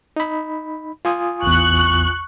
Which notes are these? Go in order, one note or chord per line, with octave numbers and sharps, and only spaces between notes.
D#4 B5
F4 G#5 D#6
A1 E2 C#6 F#6